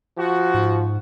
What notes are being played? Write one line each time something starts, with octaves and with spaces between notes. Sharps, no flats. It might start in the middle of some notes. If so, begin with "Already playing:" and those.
F3 F#4
G#2